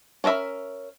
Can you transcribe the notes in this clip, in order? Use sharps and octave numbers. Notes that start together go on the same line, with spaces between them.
C#4 F4 A#4 E5 B5